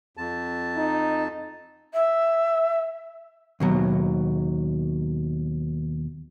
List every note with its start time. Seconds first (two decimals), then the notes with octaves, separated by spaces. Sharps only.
0.17 F2 A5
0.76 D#4
1.93 E5
3.60 D#2 B2 F#3